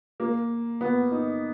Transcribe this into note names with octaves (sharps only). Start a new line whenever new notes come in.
A#3
B3
D#4